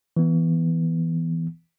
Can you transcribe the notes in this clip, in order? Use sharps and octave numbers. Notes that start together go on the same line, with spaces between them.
E3 B3